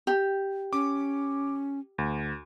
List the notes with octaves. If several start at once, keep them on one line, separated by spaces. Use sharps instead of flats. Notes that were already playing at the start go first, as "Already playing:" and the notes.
G4
C#4 D6
D2